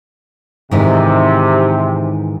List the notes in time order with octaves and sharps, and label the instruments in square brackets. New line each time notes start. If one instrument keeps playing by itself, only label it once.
[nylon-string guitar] G#2 D#3 E3 [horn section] C3